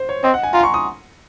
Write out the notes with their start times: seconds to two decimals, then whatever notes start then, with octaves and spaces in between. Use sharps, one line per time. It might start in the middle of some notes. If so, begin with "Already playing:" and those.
Already playing: C5
0.09 C#5
0.24 C4 D#5
0.34 F#5
0.43 G#5
0.53 F4 A#5
0.59 C6
0.63 C#6
0.74 D#6